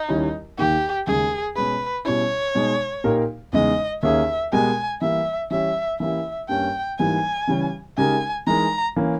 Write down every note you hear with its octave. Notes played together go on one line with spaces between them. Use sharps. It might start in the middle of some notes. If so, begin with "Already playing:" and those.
Already playing: D#4
D#2 D#3 G3 C#4 E4
D#2 D#3 A#3 D#4 G4
D#2 C#3 G#3 D#4 G#4
B2 G#3 C#4 G#4 B4
B2 G3 C#4 E4 C#5
B2 G#3 D#4
A#2 A#3 D#4 G4 A#4
E2 C#3 G#3 D#4 D#5
D#2 D#3 A#3 C#4 G#4 E5
B2 G#3 B3 G4 A#4 G#5
E3 G3 A#3 E5
E3 G3 C#4 G4 E5
E3 A#3 C#4 E4 G4 E5
G2 G3 A#3 C#4 G5
G#2 E3 G3 A#3 G#5
C#3 E3 G3 C#4 G4
C#3 G#3 D#4 G4 A#4 G#5
E3 G#3 D#4 A#4 A#5
E3 A#3 C#4